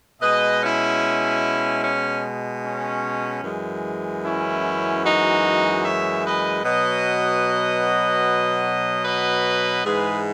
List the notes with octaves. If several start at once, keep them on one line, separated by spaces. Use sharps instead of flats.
B2 G#3 B4 D#5
C#4 E4
C#4
C#4
F#2 E3 G#3
C#4 E4
D#4 F#4
C#5 E5
B4 D#5
B2 F#3 B4 D#5
B4 D#5
G#2 E3 G#3 G#4 B4